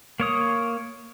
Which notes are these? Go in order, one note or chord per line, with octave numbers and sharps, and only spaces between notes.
A#3 C#5 D#6